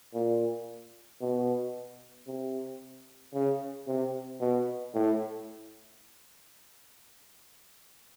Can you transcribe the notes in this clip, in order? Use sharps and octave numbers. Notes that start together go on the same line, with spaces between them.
A#2
B2
C3
C#3
C3
B2
A2